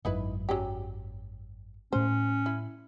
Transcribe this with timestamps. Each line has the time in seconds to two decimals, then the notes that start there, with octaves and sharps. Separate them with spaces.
0.05 G#1 F#2 D#4 E4 B4
0.49 F#3 C#4 G4
1.93 A2 A3 C#4 C5
2.46 E4